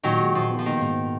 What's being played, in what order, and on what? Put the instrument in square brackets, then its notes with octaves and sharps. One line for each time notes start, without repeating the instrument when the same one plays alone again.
[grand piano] A#2 [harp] D#3 F#3
[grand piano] G#3
[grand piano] A#2 [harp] F3
[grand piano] B3
[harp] F3
[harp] D#3 [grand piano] A#3
[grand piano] G#2